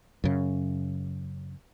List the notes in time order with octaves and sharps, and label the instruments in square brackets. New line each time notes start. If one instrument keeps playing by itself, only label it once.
[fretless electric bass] F#2 C#3